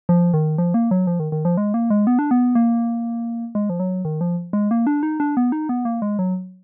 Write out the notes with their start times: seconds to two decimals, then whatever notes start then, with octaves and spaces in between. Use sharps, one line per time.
0.09 F3
0.34 D#3
0.58 F3
0.74 A#3
0.91 F#3
1.07 F3
1.20 D#3
1.32 D#3
1.45 F3
1.57 G#3
1.74 A#3
1.90 G#3
2.07 B3
2.19 D4
2.31 B3
2.55 A#3
3.55 G#3
3.70 F3
3.80 F#3
4.05 D#3
4.21 F3
4.53 G#3
4.71 A#3
4.87 D4
5.03 D#4
5.20 D4
5.37 B3
5.52 D#4
5.69 B3
5.85 A#3
6.02 G#3
6.19 F#3